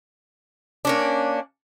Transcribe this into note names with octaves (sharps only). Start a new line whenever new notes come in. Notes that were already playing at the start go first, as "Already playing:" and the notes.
A#3 C#4 D4